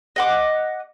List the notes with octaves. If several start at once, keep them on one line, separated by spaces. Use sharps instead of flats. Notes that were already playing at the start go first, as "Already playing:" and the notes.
D#5 F#5 D6